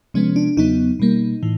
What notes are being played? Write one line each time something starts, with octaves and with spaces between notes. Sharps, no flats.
C3 F3 G#3 B3 C#4
D4
E2 C#3 F#3 B3 D#4
B2 G3 A#3
A2 E3